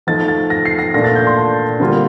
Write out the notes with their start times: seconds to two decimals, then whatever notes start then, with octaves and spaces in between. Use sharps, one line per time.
0.07 F3 A3 D#4 A6
0.28 A6
0.50 A#6
0.65 C7
0.79 A#6
0.94 A#2 A3 D4 A#6
1.04 A6
1.15 G6
1.27 C6
1.37 A5
1.80 D3 G3 A#3 F4